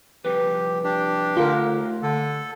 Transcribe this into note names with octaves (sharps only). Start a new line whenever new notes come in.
C2 F2 G4 B4
D4 G4
D3 A3 F4 A#4 C6
D#2
D3 A4